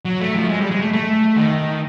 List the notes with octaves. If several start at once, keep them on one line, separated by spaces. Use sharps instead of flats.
F#3
A3
F3
G#3
G3
G#3
A3
A3
D#3